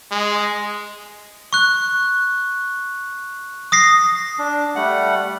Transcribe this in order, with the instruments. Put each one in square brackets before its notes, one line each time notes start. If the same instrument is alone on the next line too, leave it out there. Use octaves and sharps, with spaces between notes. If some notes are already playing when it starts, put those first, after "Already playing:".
[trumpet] G#3
[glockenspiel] C#6 F#6
D#6 A#6 C7
[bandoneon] D4
G3 A3 F#5